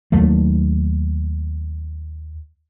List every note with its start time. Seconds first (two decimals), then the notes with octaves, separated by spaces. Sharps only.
0.12 D#2 F#3 A3 A#3